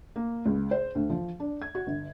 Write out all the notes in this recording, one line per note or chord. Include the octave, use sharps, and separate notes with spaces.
A#3
C#2
C5
D2
F3
D4
G#6
F#4
G1